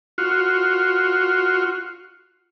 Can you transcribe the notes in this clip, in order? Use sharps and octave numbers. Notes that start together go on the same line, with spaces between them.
F4 F#4